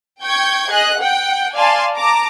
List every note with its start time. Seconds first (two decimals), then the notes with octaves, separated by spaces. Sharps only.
0.23 G5 C#6 G6 G#6
0.70 G#4 D#5 F#6
0.98 F#5 G5
1.55 D5 F5 G#5 A5 C6
1.95 A5 A#5 D6